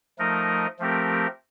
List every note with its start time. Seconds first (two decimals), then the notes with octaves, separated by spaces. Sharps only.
0.19 F3 A3 D#4 A#4 D#5
0.79 F3 A3 C4 G4 A#4